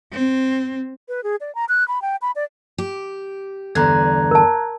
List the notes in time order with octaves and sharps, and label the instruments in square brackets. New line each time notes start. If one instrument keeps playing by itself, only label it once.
[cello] C4
[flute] B4
G#4
D5
A#5
F#6
B5
G5
B5
D5
[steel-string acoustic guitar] G4
[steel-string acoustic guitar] E2 G2 D3 [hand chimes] A#5 F#6 G#6
[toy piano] A#4 A5